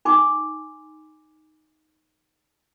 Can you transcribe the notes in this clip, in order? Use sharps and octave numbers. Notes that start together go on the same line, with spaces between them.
D#4 G#5 C6 D6